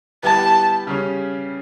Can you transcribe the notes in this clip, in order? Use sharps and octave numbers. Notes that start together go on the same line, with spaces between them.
G3 B3 E4 G4 B4 A5
C#3 G3 C#4